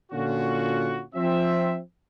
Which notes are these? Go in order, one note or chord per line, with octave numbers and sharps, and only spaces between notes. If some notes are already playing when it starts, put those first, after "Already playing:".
A#2 D3 C#4 F4 F#4
F3 C4 E5